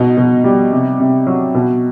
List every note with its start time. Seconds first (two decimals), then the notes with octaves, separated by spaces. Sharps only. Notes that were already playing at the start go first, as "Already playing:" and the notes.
Already playing: B2 D#4
0.17 B2
0.44 G3
0.72 C3
1.00 C3
1.27 F#3
1.55 B2